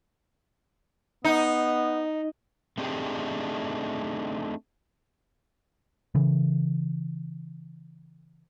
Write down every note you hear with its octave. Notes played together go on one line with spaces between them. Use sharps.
B3 D#4
A3 C4 D4 D#4 G4 G#4
C#3 E3